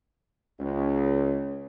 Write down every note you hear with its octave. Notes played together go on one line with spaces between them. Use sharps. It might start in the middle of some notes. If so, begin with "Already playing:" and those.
C#2